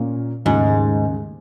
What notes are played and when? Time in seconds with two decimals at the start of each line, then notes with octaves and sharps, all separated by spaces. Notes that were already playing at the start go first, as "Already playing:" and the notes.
Already playing: A#2 A#3 C#4 F4
0.45 D#2 G#2 C#3 G#3